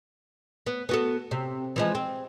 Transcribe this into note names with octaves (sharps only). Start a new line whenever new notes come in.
B3
B3 F#4 A4
C3
E3 F3 G#3
C4